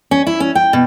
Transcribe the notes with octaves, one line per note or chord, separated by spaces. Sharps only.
C#4
E4
C#4
G5
B2